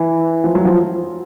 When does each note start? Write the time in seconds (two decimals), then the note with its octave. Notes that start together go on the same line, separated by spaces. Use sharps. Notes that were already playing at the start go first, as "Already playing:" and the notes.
Already playing: E3
0.44 F3
0.55 F#3
0.65 F3